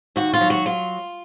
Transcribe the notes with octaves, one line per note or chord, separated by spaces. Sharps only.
D#2 F#4
F4
F#3
F#4
F4